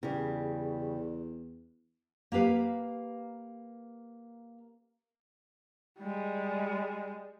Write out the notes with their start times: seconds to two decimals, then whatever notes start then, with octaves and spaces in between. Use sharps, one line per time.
0.03 E2 C#3 G3
2.32 A#3 G4 B4 F5
6.00 G3 G#3